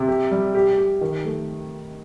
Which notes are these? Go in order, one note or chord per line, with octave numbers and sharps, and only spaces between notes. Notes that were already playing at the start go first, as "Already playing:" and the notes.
Already playing: C3
G4
G3
G4
G4
D#3
A3